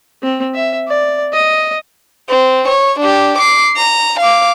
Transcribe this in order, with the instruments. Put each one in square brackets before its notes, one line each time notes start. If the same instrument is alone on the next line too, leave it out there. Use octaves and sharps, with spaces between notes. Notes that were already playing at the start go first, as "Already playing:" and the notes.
[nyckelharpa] C4
E5
D5
D#5
[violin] C4
C#5
D4 G4
D6 C7
A#5
F5 D6